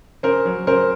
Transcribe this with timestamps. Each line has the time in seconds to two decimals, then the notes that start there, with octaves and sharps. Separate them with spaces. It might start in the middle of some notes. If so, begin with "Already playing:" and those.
0.23 C#3 A#4 C5
0.45 F#3
0.67 C#3 A#4 C5